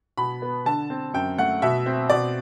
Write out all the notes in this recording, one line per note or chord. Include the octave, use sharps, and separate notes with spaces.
B2 B5
B3
D3 A5
C4
F#2 G5
A3 F#5
B2 E5
C4
B2 D5